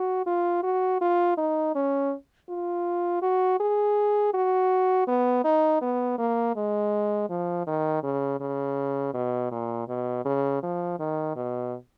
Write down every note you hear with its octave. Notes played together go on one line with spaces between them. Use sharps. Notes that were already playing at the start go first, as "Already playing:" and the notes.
Already playing: F#4
F4
F#4
F4
D#4
C#4
F4
F#4
G#4
F#4
B3
D#4
B3
A#3
G#3
F3
D#3
C#3
C#3
B2
A#2
B2
C#3
F3
D#3
B2